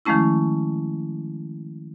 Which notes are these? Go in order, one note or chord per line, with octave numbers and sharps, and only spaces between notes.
D#3 F3 G#3 A3 C#4 E4